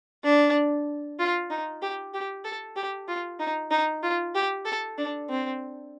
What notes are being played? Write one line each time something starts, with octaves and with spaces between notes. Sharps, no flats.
D4
F4
D#4
G4
G4
A4
G4
F4
D#4
D#4
F4
G4
A4
D4
C4